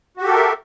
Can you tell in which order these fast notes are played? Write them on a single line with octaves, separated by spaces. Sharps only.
F#4 G4 A4 A#4 E5